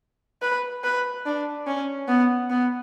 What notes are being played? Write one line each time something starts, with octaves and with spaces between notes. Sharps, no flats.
B4
B4
D4
C#4
B3
B3